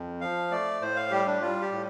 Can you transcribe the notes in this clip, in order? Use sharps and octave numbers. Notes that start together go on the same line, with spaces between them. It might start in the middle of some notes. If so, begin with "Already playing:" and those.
Already playing: F2
F3 F5
A3 D5
A2 C5
F5
G3 G4
D4
G3 F4
G4
A2